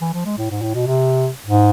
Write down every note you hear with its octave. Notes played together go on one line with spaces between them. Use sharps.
E3
F3
G#3
A2
G#2
A2
B2
C3
G#2